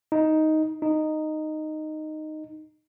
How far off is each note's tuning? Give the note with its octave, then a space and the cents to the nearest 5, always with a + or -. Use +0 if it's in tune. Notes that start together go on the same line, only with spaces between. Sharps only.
D#4 +5
D#4 -10